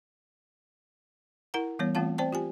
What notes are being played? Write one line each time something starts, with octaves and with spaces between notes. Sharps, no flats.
E4 A#4 F#5 A#5
E3 G3 B3 C#5
E3 A3 C4 F4 F5 A5
C4 C5 D5 G5 A5
F4 G4 G#5